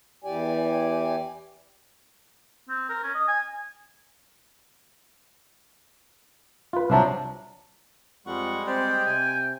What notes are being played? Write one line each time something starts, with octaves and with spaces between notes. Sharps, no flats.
E2 E3 G4 D5 G#5
C4
A#4
C#4
D#5
G#5
F4 B4
C2 F3 F#3 D4 E5 A5
F2 G3 G#3 F#5 C#6
C4 G4 C5 D5 G5
C3 G#5